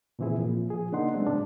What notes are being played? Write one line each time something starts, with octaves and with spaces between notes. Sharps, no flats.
A#2 C#3 E3 C4 E4 G#4
A#2 F3
F3 G#4
C#3 A#3 D4 D#4 F#5 C6
F#3 G#3 A3 B3 C4 D4
A2 C#3 D4